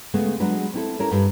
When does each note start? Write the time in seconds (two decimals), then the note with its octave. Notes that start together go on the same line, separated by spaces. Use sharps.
0.14 C#3 G#3 A3 B3
0.40 F#3 G#3 D4 G#4 B4
0.74 C4 E4 A4
0.99 C#4 E4 A#4
1.11 G2 G3